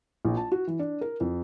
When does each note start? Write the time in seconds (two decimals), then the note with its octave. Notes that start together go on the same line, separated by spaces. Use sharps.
0.25 A#1
0.37 A5
0.52 F#4
0.67 E3
0.79 D4
1.01 A#4
1.20 F2